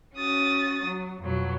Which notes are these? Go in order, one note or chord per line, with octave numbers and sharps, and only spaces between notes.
C#4 F#4 D#6 A6
F#3
F2 B2 F#3